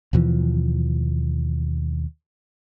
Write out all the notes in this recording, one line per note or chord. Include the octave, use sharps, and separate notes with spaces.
D#2 B2 E3 F3